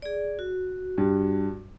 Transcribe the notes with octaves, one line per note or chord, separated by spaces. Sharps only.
G#4 D5
F#4
G2